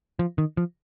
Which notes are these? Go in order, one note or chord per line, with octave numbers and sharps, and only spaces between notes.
F3
D#3
F3